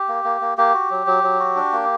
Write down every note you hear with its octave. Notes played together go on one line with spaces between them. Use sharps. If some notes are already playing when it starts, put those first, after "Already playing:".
Already playing: G4
A#3
A#3
A#3
A#3 G4
F#4
F#3
F#3
F#3
F#4
D4
A#3